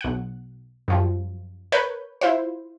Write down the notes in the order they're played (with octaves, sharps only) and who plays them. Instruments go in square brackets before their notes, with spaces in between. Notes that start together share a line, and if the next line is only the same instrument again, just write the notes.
[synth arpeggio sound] B1 F#5
F#2 F3 G3
A#4 B4 C#5 G6
E4 F4 C5